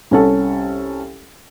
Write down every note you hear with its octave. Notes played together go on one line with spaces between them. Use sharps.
C2 C#4 A4